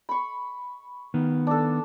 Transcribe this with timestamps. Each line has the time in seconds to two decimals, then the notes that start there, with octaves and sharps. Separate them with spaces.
0.09 B5 C#6
1.14 D#3 B3
1.47 D4 A4